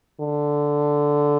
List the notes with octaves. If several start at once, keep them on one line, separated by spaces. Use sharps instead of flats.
D3